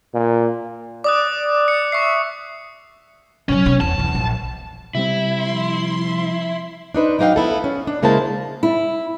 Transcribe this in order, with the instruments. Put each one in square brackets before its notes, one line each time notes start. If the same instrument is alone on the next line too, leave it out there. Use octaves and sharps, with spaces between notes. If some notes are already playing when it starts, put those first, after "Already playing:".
[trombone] A#2
[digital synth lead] D5 [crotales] D6 D#6 F#6
[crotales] C#7
[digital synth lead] E5 [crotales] C#6 C7
[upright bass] C#3 F#3 [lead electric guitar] C#4 C#5
[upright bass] C3 B3
[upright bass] E2 [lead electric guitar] A5
[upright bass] E2
A#1
[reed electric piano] C3 G3 C4 [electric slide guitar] E4
[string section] F3 C6
[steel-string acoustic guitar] D4 D#4 B4 C5
F#3 D4 D#4 F5 G5
B3 E4 A4
C#4
D4
C#3 G#3 A#3 E4 C5 A5
E4